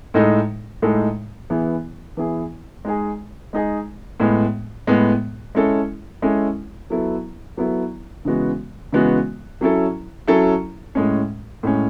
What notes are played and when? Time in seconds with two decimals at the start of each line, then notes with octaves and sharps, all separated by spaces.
0.14 A2 G#3 D#4 A4
0.82 A2 G#3 D#4 A4
1.50 E3 B3 E4 G#4
2.17 E3 B3 E4 G#4
2.85 G#3 D#4 G#4
3.53 G#3 D#4 G#4
4.20 A2 G#3 B3
4.87 A2 G#3 B3
5.55 G#3 C#4 E4 A4
6.22 G#3 C#4 E4 A4
6.90 F#3 B3 E4 A4
7.57 F#3 B3 E4 A4
8.25 C#3 E3 G#3 B3 F#4
8.93 C#3 E3 G#3 B3 F#4
9.61 F#3 C#4 E4 A4
10.27 F#3 C#4 E4 A4
10.95 A2 G#3 C#4
11.63 A2 G#3 C#4